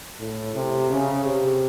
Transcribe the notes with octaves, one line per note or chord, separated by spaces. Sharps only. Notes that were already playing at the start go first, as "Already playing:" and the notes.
A2
C3
C#3
C3